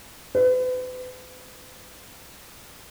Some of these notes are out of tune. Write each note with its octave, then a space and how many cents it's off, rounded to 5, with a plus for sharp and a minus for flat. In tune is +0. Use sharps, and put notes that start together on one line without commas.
B4 +40